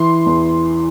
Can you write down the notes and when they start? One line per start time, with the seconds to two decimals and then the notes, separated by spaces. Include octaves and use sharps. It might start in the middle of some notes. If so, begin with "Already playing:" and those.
Already playing: E3 C6
0.26 E2